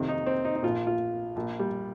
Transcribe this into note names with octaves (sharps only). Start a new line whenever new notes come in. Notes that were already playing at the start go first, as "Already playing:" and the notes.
Already playing: F2 C3 D#3
D#4
C4
D#4
D#4
A#1 A#2 F4
F4
A#1 A#2
G3